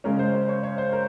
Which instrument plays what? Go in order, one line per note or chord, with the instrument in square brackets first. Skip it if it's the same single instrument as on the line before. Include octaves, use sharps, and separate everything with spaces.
[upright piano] C#3 G#3 C#4 A#4
C5
C5
C#5
C#5
C5
A#4